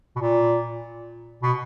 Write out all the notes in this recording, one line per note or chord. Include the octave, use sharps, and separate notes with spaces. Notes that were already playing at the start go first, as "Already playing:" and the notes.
B2
A#2
B2